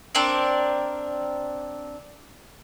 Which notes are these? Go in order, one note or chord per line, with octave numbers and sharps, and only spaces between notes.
C4 D4 A#4 D5